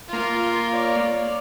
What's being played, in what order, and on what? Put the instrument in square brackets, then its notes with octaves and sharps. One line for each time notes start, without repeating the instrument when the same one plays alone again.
[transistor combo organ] A#3 [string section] F4
[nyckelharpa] C#5 D5